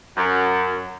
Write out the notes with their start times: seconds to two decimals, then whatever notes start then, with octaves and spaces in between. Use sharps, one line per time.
0.17 F#2